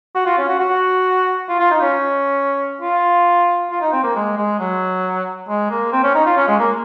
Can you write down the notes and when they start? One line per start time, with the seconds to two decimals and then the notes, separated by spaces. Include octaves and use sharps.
0.15 F#4
0.26 F4
0.38 C#4
0.48 F#4
0.60 F#4
1.49 F4
1.60 F4
1.71 D#4
1.81 C#4
2.81 F4
3.71 F4
3.81 D#4
3.92 C4
4.04 A#3
4.15 G#3
4.37 G#3
4.59 F#3
5.48 G#3
5.70 A#3
5.93 C4
6.03 C#4
6.15 D#4
6.26 F4
6.37 C#4
6.48 G#3
6.59 A#3